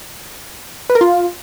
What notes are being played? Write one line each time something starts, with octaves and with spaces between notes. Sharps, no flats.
B4
A#4
F4